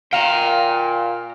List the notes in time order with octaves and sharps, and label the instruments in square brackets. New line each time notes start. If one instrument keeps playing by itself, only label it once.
[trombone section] A#2 [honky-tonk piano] F5 [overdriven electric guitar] G5 A#5